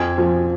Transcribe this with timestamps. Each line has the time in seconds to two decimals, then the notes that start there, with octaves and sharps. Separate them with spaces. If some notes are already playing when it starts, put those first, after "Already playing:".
Already playing: F2 G#5 G#6
0.18 F3